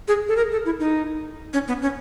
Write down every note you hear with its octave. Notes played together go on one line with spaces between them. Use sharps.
G#4
A4
A#4
A4
E4
D#4
C#4
B3
C#4